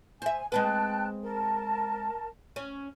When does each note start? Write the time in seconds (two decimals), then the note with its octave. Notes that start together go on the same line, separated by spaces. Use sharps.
0.22 C5 E5 G#5
0.52 G#3 C4 B4 G5 A5 F#6
1.22 A#4 A5
2.56 C#4